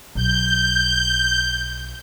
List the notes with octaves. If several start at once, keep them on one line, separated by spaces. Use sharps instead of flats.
B1 G6